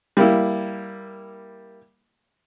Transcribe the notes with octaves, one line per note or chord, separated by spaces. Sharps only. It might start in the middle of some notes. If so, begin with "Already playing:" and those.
G3 A#3 E4